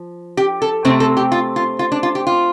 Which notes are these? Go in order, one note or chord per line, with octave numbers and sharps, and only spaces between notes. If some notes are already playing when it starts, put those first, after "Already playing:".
Already playing: F3
G4
A4
C3 A3 C4 C5
A4
G4
F4
F4
F4
D4
F4
G4
F4